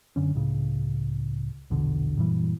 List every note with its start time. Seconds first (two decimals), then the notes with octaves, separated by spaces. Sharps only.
0.16 F#2 D3 C#4
0.34 C#2 A2 C#3
1.70 A#1 E2 B2 D3
2.17 F#2 A#2 E3 G3